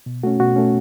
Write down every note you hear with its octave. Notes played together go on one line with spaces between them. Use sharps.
B2
A3 C#4 F#4
B2 F#4
A3 C#4